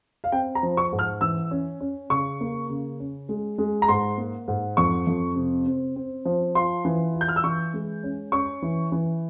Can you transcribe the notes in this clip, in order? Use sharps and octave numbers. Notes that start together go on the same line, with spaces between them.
F5
C4 G5
A#5
F3
C#6
G#2
F6
E3 E6
C#4
C#4
C#3 C#6
A#3
C#3
C#4
G#3
G#3
A#5
G#2 C6
A#3
G#2
F2 C#6
F2
C3
C4
C4
F3
F4 C6
E3
F4
G6
F6
E6
E3 C#6
G#3
C#4
C#4 C#6
E3
E3